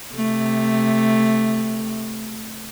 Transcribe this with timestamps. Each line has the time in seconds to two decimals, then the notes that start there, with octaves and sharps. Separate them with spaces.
0.14 C3 A3